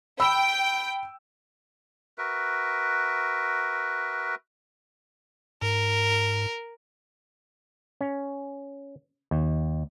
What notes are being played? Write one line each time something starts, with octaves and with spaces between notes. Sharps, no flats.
G5 B5 E6
F#4 A#4 B4 E5
G#2 A#4
C#4
D#2